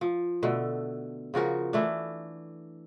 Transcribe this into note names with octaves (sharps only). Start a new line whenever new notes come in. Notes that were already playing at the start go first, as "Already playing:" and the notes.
F3
B2 D3 A3
C#3 F3 F#4 A#4
E3 A3 D4